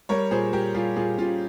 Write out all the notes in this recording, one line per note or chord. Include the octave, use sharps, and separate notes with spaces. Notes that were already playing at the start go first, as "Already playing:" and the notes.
G3 A#4 C#5
A#2 G#4 C5
G3 G4 A#4
G3 F4 G#4
A#2 F4 G#4
A#2 C#4 F4